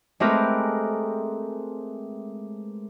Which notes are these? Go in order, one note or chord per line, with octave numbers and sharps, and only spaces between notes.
G#3 A3 C4 G4 A#4 B4